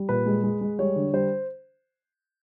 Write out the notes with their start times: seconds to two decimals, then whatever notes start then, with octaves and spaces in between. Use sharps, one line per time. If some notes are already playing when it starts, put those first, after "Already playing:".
Already playing: G3
0.09 A#2 B4
0.26 G#3
0.44 G#3
0.61 G#3
0.79 G3 C#5
0.96 D3
1.13 G3 C5